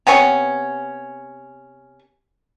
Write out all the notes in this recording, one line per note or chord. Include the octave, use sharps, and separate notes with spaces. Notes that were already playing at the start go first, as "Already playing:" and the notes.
C3 B3 C#4 C#6